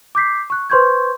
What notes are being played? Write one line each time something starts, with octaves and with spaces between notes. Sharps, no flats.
D6 G6 B6 C7
C#6 F#6
B4 C5 C6 C#6 G6 G#6